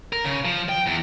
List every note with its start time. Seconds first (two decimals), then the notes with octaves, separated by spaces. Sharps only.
0.13 A#4
0.25 C#3
0.45 F3
0.69 G5
0.87 E2